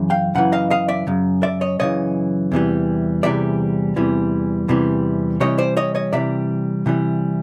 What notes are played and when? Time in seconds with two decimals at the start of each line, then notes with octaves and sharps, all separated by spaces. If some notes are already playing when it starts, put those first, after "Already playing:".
Already playing: F#2 C#3 E3
0.10 F5 G5
0.35 F#2 C#3 E3 F#5
0.52 D#5 F5
0.70 D#5 F5
0.88 D5 E5
1.07 F#2 C#3
1.43 D5 E5
1.61 C#5 D#5
1.79 F#2 C#3 E3 C#5 D#5
2.52 E2 C3 E3 G3
3.23 E2 C3 E3 G3 D5 E5
3.96 E2 C3 E3 G3
4.68 E2 C3 E3 G3
5.40 C3 E3 G3 C#5 D#5
5.58 C5 D5
5.77 C#5 D#5
5.95 C#5 D#5
6.13 C3 E3 G3 D5 E5
6.86 C3 E3 G3